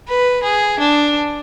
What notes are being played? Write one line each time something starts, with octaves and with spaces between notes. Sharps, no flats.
B4
G#4
D4